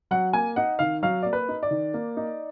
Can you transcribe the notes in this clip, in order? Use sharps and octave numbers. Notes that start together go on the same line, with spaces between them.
F#3 F#5
A#3 G#5
D#4 F#5
D#3 F5
F#3 F5
A#3 D5
B4
D#4
D5
D#3
A#3
D#4